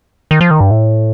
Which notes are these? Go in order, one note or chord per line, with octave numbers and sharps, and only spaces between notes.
D#3
F3
D#3
G2
A2